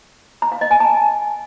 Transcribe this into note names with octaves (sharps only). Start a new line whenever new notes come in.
A#5
F5
D#5
G#5
A5